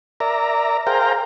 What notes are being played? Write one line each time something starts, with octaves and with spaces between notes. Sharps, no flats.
A#4 D5 E5 A#5
G#4 A#4 C5 F5 G5 A#5